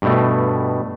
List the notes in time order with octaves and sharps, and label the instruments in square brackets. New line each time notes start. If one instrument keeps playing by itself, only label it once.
[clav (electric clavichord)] G2 B2 A3